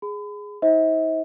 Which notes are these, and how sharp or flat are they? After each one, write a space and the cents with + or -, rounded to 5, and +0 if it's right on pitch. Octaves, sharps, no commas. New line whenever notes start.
G#4 +0 B5 +40
D#4 +45 C5 +20 E5 -45